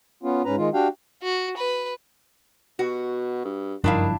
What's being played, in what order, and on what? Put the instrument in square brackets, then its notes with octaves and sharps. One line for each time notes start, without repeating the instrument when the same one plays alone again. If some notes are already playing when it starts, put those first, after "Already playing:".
[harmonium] B3 C#4 F4
G#2 C#4 B4 A#5
D#3 G#3 F4
D4 F#4 G4 F5 G5
[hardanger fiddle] F#4
B4
[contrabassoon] B2 [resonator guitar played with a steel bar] F#4
[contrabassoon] G2
[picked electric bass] F#1 G2 F3 [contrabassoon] D#3 [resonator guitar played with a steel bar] D4 E4 F5